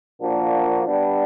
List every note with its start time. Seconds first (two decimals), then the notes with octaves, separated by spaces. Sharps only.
0.21 A#2 F3 A#3 D4 F#4
0.84 G3 B3 D4